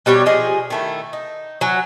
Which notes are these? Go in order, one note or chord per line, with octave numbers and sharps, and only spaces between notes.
B2 G3 G4 C#5
F3 G4 G#4 D#5
D#3 A3 E4
D#4
F#3 G#5